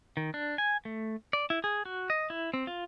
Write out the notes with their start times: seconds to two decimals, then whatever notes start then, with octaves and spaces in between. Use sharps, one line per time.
0.17 D#3
0.34 D4
0.58 G#5
0.85 A3
1.33 D5
1.50 E4
1.64 G#4
1.85 F#4
2.10 D#5
2.30 E4
2.54 C4
2.67 F4